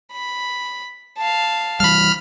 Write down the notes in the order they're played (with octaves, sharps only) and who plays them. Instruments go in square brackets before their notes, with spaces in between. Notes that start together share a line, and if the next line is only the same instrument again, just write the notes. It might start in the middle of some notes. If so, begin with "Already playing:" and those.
[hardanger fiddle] B5
F5 A5
[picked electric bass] E3 G3 [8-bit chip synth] B5 F6